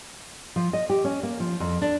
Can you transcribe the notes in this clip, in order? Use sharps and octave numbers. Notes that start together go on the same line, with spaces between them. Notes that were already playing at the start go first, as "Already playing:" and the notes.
F3
D#5
G4
C#4
A#3
F3
F2
D4